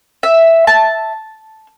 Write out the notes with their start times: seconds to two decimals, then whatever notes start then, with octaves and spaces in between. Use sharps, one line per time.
0.23 E5
0.67 A5